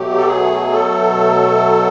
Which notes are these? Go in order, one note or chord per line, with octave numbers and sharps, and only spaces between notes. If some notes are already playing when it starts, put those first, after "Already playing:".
Already playing: B2 F#3 A3 G4
A4
G#4
A4